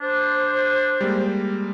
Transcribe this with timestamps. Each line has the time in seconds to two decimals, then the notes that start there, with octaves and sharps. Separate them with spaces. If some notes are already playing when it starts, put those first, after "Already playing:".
0.01 D4 C5
1.01 G3 G#3 A#3